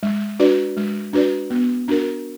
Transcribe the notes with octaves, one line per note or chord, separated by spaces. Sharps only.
G#3
D4 F#4 B4 D5
G#3
D4 F#4 B4 D5
B3
D4 F#4 A#4